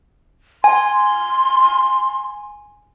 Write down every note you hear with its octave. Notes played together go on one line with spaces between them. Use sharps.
G#5 C6